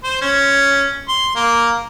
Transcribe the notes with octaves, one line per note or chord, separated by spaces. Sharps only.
C5
C#4
C6
A#3